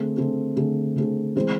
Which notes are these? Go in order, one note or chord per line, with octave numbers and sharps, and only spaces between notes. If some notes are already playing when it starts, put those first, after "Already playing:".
Already playing: D3 A3 C4 G#4
D3 A3 C4 G#4
D3 A3 C4 G#4
D3 A3 C4 G#4
E3 G#3 C4 G#4 C5